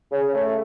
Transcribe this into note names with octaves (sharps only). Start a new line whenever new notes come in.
C#3
A3